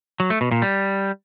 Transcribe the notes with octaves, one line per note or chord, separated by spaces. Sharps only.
F#3
A3
B2
A#2
G3